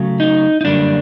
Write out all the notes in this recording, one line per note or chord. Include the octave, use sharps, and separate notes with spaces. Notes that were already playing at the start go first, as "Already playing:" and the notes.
Already playing: C#3 F#3 A3
D#4
D#4
F#2 D3 G3 A#3 D4